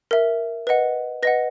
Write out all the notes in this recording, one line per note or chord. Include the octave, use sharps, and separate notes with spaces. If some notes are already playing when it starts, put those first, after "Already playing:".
A#4 E5
B4 D#5 F#5
B4 D#5 F#5 A#6